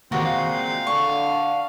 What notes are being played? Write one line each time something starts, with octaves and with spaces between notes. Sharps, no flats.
A#2 D#3 G#3 C4 F#4 G4
F5
D3 C#6